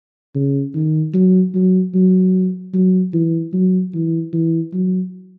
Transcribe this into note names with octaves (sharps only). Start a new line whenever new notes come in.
C#3
D#3
F#3
F#3
F#3
F#3
E3
F#3
E3
E3
F#3